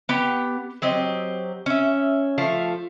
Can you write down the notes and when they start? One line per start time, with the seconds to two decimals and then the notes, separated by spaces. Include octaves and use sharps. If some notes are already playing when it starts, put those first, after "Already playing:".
0.09 B3 G4 F#5
0.82 F#3 C4 G4 D#5
1.66 C#4 E5
2.38 F3 A3 F5